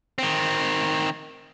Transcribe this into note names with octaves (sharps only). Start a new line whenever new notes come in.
D#3 C4